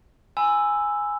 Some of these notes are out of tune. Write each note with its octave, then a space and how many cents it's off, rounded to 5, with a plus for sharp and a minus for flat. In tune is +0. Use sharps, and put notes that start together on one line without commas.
G#5 +0 B5 +30 E6 +0